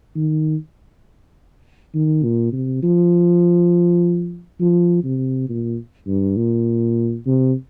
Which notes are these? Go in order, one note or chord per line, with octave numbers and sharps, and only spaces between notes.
D#3
D#3
A#2
C3
F3
F3
C3
A#2
G2
A#2
C3